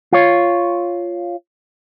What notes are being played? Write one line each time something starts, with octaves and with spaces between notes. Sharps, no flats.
F4 C#5